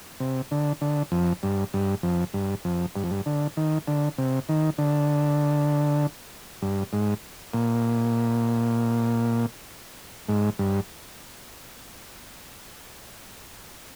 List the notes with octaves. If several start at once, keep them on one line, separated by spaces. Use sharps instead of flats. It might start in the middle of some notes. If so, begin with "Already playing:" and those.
C3
D3
D3
F2
G2
G2
F2
G2
F2
G2
F2
G2
D3
D#3
D3
C3
D#3
D3
G2
G#2
A#2
G#2
G2